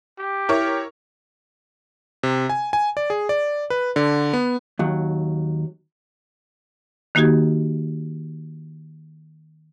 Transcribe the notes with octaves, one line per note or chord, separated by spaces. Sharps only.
G4
E4 A#4 C#5
C3
G#5
G#5
D5
G#4
D5
B4
D3
B3
D#2 F#3
D#3 A#3 D#4 F#4 G4 G#6